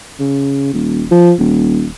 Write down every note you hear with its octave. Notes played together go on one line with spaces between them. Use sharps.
C#3
D#1
F3
D#1